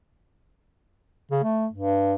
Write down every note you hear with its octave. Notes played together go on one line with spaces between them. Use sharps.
C#3
A3
G2